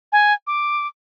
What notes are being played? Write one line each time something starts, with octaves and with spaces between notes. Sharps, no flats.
G#5
D6